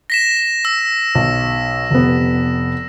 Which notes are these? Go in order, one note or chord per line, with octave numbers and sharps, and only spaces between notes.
A#6 B6 E7
E6
B1
F1 B3